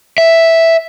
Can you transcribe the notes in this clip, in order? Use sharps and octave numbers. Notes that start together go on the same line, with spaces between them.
E5